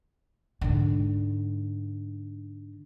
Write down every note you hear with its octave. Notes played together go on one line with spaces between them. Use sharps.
G#2 D3